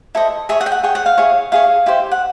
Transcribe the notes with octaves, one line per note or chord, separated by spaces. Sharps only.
E4 A4 C5 D#5
G#4 C#5 E5
F#5
G5
F#5
G#4 C#5 G5
F#5
F5
E4 G#4 C#5
E4 G#4 C#5 F5
E4 G4 C5
F#5